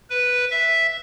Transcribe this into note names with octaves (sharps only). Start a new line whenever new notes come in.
B4
E5